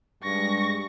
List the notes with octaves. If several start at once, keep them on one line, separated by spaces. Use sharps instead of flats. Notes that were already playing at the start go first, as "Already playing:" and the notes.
G2 G#3 C#6 A#6